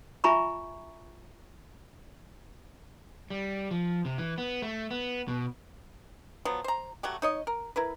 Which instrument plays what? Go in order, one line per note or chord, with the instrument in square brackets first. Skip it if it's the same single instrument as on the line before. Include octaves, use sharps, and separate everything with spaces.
[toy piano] F4 E5 G#5 A#5 B5 C#6
[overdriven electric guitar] G3
F3
C3
E3
B3
A3
B3
B2
[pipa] F3 F#3 B3
C5 A#5
F#3 A3 F#4 G4
D#4 C#5 D#5
A#4
E4 A#4 B4